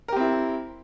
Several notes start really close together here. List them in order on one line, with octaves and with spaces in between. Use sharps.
A#4 G4 C4 E4